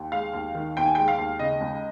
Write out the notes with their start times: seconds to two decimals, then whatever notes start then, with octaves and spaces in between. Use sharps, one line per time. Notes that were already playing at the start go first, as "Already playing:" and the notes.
Already playing: D#2
0.12 G#3 F5
0.33 D#2
0.55 D#3
0.77 D#2 G5
0.85 G#5
0.95 G#3 G5
1.08 F5
1.18 D#2
1.39 C#3 D#5
1.61 C#2